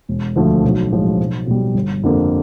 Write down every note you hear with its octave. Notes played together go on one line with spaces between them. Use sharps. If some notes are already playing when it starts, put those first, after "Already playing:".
E1
D2 D3 F3 A3
B1
A2 F3 G#3
B1
B2 G3
G1
F2 D3 G3 A#3